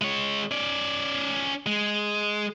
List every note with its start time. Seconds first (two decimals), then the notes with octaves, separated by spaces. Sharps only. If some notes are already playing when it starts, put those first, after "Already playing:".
0.02 G#3 C#5
0.51 C#4 D5
1.66 G#3